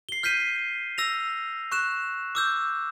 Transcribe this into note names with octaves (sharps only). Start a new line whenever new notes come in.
C7 G7
F6 G6 B6 C7 D#7
E6 A#6 F7
C#6 F#6 E7
D6 E6 G6